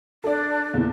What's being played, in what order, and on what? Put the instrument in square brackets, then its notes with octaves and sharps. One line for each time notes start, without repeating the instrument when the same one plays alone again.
[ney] D4 [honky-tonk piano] A4 D5
[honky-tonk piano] E2 A#2 E3